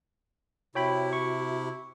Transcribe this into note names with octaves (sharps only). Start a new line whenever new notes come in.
C3 E4 F#4 C#5 G5 B5
C#6